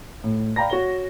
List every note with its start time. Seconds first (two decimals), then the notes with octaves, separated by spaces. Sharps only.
0.24 A2
0.56 D5 F5 G5 A#5 B5 A#6
0.70 F#4 C#5 G7